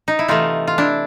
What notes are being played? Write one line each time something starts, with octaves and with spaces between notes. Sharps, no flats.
D#4
E4
C3 E3 A3 D#4 F4
F4
D4 E4